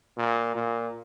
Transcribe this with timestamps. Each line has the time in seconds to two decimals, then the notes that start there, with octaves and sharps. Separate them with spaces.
0.17 A#2
0.55 A#2